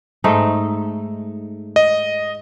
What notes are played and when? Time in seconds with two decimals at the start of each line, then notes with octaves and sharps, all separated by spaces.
0.24 G#2 A3 D#4
1.76 D#5